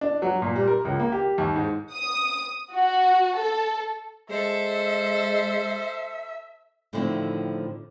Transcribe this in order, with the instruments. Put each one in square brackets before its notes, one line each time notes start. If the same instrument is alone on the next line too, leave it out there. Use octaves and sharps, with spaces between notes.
[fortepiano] D4
F#3
A#2
G3
A#4
C#2
A#3
G4
D#2
G#2
[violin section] D#6
F#4
A4
[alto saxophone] G#3 [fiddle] A4 C5 [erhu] E5
[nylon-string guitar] A2 D3 D#3 F3 C4 E4